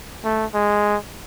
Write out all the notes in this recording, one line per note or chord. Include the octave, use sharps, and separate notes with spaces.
A3
G#3